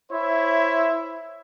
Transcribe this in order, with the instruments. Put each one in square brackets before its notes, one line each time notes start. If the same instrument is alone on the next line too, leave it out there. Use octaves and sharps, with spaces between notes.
[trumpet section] E4 C5 C#5 E5